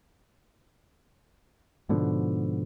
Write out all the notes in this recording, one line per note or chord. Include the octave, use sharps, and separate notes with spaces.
G#2 B2 D3 F3